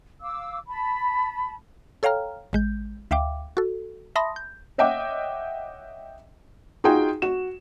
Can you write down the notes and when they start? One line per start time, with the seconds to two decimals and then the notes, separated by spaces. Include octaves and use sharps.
0.20 F5 D6 E6
0.67 A5 B5
2.03 A4 C#5 F5 G5 A#5 F6
2.53 A1 G#3 G6
3.11 D2 E5 F5 G5 D6
3.57 F#4 A4
4.16 E5 A5 B5 C6 D#6 A#6
4.36 G6
4.78 C#5 D#5 E5 F#5 G5 D6
6.84 D#4 F4 F#4 G#4 F#5 G5
7.22 F#4 E7